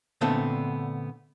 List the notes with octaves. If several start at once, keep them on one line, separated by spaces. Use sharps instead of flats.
A#2 D3 A3 B3 C4